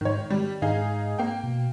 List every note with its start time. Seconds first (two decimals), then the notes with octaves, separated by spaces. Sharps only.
0.01 G#2 D#3 C#5
0.30 D#3 G3
0.62 G#2 D#4 G#4 F5
1.18 A#3 G5
1.43 B2